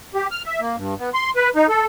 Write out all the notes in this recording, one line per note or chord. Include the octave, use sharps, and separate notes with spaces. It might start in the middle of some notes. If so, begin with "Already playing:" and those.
G4
F6
E5
A#3
G2
B3
C6
B4
D#4
A4